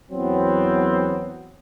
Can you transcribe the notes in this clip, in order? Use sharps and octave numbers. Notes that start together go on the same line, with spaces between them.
E2 F#3 B3 C4